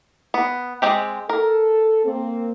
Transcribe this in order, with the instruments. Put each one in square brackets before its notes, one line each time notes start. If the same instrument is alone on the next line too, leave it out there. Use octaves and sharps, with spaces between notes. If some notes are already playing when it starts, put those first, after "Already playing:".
[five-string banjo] B3
G#3 C4 G4
[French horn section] A4 [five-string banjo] A#4
[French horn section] A#3 C4